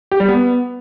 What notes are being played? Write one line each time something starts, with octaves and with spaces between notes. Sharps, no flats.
G4
G3
B3